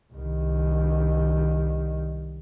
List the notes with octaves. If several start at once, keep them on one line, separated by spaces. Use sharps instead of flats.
C2 D#3